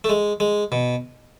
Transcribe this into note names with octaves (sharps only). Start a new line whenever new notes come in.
A3
G#3
G#3
B2